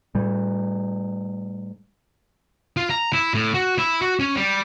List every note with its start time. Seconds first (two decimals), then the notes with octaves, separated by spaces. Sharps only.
0.15 A2 G3
2.77 F4
2.90 A#5
3.13 E4
3.34 A2
3.54 F#4
3.78 E4
4.01 F#4
4.20 C#4
4.36 G3